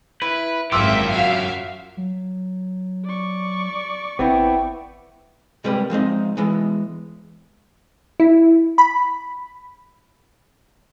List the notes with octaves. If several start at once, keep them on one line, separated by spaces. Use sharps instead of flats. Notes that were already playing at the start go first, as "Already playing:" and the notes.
E4 B4
G#1 F#2 A#3 F4 G4 E5 D6 E6
F#4 E5 F5
F#3
D5 C#6
G#1 B3 C4 E4 G5
C3 G3 G#3 A#3 B4
F3 G#3 C4 D#4
E3 G#3 B3
E4
B5